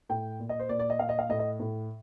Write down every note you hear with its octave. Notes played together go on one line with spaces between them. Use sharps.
A2 G5
A#2
D#5
C5
A#2 D5
D5
D#5
A#2 F5
D#5
F5
A2 D#5
D#5
A2